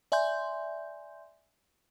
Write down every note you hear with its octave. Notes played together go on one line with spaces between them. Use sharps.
D5 E5 G#5 C6 G6